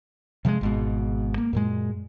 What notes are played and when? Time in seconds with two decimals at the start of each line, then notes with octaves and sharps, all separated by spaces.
0.45 C3 F3 F#3 G#3
0.61 G#1 G#2 B2
1.38 A#3
1.53 F#2 A#2 G#3